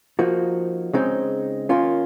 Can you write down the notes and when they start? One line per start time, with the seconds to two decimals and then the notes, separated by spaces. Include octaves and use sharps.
0.19 F3 A#3 D#4 F#4
0.93 C#3 G#3 C4 D#4
1.69 D#3 A#3 C#4 F4